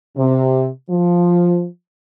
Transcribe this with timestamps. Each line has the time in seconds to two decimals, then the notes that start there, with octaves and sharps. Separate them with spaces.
0.17 C3
0.90 F3